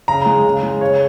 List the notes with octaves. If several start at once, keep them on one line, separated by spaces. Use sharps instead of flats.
C#3 A#5
G#3
C#3
G#3
C#3 C#5